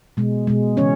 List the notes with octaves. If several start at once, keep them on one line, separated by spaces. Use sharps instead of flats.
B2 G#3
B2 G#3
C#3 E3 C#4 C#5